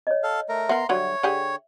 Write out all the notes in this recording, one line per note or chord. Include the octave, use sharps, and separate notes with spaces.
C#5 D#5
A4 F5
A3 A#4
B3 A#4 E5 A#5 C6
D3 F#3 G3 C#5
D3 G4 G#4